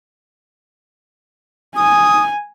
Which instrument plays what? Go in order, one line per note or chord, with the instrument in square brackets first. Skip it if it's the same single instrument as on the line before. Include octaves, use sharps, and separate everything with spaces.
[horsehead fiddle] G#5 [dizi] D#6